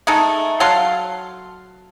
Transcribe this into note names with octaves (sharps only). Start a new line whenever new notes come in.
G#3 A3 D#4 A4
F#3 A4 F5 C6